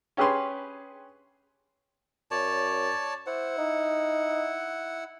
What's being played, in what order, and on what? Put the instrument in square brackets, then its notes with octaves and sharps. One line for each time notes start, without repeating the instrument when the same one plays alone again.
[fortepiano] C#4 G4 G#4 B4 C6
[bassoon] F#2 [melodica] C#5 D5 A5
[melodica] E4 F#5 [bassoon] C5
[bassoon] D#4